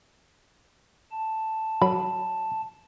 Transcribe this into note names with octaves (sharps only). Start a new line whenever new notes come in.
A5
F#3 B5